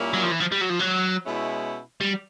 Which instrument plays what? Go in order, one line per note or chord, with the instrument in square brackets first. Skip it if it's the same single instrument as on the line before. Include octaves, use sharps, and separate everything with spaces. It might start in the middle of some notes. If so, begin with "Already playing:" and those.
Already playing: [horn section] A#2 G3 A#3 C#4 E4
[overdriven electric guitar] F#3
F3
E3
F3
G3
F#3
F3
F#3
[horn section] B2 G#3 C#4 E4
[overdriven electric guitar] G3